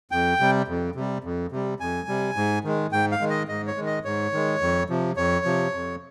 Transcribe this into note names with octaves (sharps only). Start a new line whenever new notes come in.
F2 G5
C3 G3
F2
C3 G3
F2
C3 G3
F2 G#5
C3 G3
G#2
D#3 G#3
G#2 G5
F5
D#3 G#3
D#5
G#2 D#5
C#5
D#3 G#3
D#5
G#2 C#5
D#3 G#3
F2
C3 F3
F2 C#5
C3 F3
F2